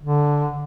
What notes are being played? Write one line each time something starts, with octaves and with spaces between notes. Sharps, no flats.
D3